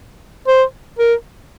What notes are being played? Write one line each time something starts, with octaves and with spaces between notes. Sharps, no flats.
C5
A#4